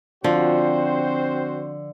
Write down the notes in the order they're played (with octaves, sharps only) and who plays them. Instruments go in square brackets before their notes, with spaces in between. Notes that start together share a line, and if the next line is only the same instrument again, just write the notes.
[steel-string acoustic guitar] D3 [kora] F3 [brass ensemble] C4 F#4 C5